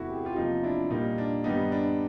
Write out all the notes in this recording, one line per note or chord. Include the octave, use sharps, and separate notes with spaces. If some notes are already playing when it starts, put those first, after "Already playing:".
Already playing: E2 C3 E3 A3 E4 F#4
G4
G#4
F4 G4
E2 C3 F3 A#3 D#4 F4
D4 E4
A#2 G3 A#3 D#4
D4
G2 D#3 G3 B3 D#4
D4